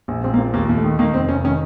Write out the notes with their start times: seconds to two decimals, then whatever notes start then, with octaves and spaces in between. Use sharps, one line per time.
0.08 A#1
0.24 A#1 C4
0.34 A#3
0.38 A#2 C4
0.54 D#2 A#3
0.69 D#2
0.76 A3
0.84 D#3
0.99 D#3 A#3
1.14 F1 C4
1.29 F1 C#4
1.44 D#3 C#4